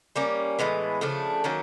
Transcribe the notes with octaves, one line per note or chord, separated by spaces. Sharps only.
G3 A#3 C#4
A2 E3 G#3 B3
C#3 F3 A3 D4
D#3 F#3 A#3 C#4